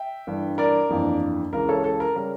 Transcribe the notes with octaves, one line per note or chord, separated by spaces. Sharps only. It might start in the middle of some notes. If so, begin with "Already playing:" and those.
Already playing: E5 G5
G1 G2 E3
A#4 D5
G1 F2 E3 A#3 D4
C#2 C#3 E3 A#4
A4 C#5
A4
A#4
C#3 G3 C#4 A#4